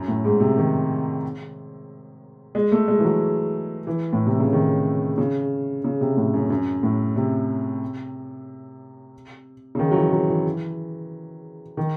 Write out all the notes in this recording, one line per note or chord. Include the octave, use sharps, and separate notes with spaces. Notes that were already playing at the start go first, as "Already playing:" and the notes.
Already playing: F#2
A2
G#2
C3
D#3
G#3
A3
G#3
E3
F#3
E3
A2
C3
C#3
D#3
C#3
C#3
C3
A2
F#2
F#2
A2
C3
C#3
D#3
F#3
E3
F#3
E3
D#3